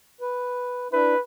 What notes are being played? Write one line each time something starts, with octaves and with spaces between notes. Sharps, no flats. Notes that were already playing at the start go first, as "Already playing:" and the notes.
B4
D4 E4 B4 E5